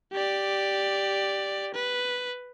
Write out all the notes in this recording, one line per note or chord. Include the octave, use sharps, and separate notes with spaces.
G4 D5
B4